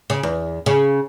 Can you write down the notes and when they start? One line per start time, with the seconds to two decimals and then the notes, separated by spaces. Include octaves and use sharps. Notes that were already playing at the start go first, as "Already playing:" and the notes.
0.10 C#3
0.23 E2
0.66 C#3